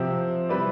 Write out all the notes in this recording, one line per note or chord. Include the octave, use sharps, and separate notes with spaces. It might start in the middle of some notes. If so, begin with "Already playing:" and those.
Already playing: C3 F3 C4 G4
G3 C4 E4 B4 D5